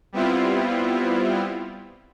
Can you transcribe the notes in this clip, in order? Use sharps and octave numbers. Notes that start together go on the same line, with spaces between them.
G3 B3 C4 E4 F4